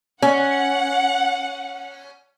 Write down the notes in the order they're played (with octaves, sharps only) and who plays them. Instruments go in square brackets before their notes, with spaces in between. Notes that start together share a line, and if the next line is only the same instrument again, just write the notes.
[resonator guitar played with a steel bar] C#4 [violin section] F#5